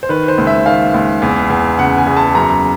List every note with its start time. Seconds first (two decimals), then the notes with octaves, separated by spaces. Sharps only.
0.03 C5
0.09 D#3 B4
0.28 C5
0.38 C#2
0.47 E5
0.66 D#3 F5
0.94 C#2
1.22 E2
1.50 E2
1.78 C#3 F#5
1.98 G#5
2.07 E2
2.17 A5
2.35 F#2 A#5